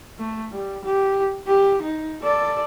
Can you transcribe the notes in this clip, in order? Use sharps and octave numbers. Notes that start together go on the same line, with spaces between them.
A3
G3
G4
G4
D#4
A4 D5